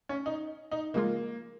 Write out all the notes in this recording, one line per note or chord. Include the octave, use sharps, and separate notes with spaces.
C#4
D#4
D#4
C#3 F3 G#3 A#3 F4